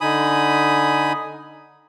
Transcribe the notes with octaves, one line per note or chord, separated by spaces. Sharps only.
D3 D#4 G#5 B5 D#6